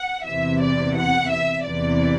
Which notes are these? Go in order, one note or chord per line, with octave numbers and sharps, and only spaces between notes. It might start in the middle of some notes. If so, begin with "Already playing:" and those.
Already playing: F#5
E2 C3 E3 E5
D5
F#5
E5
E2 C3 E3 D5